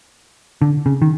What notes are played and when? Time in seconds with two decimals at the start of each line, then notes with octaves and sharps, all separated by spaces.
0.62 D3
0.86 C#3
1.02 D#3